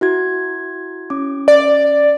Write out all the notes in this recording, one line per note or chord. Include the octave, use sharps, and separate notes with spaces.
E4 F#4 G#6
C#4 D6
D5